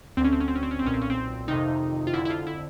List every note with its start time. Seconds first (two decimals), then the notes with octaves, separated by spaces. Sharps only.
0.17 D2 C4
0.21 D3 C#4
0.32 C4
0.40 C#4
0.48 C4
0.55 C#4
0.63 C4
0.71 C#4
0.79 C4
0.83 B1 A#2 C#4
0.94 C4
1.01 C#4
1.10 C4
1.48 F2 C3 D#3 D#4
2.07 F4
2.13 D3 E4
2.17 F2
2.25 E4
2.30 F4
2.47 E4